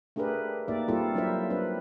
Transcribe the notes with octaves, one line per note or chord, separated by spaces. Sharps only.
A3 D4 G4 G#4 A#4 B4
A#3 D#4 G4 D5 E5
G3 A#3 C4 E4 F4 A4
F#3 D4 E4 A#4 C5 E5
C4 D4 B4